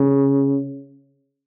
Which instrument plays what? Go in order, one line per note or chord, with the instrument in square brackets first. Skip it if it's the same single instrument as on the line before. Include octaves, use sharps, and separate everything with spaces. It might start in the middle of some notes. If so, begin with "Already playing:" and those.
Already playing: [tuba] C#3